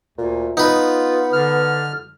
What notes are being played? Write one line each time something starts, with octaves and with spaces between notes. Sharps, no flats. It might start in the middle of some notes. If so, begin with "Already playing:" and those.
D2 A#2
B3 D#4 F4 B4
D3 F6